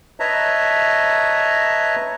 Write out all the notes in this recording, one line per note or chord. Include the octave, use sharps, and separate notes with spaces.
B4 C#5 D#5 E5 A5 A#5